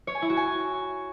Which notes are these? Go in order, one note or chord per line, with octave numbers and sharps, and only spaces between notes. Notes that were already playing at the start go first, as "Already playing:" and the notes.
C#5
G#5
E4
F#4
G#5